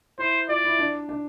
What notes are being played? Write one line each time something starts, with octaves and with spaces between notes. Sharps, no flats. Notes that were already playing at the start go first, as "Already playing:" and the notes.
E4 C5
F4 D5
E4
D4
D4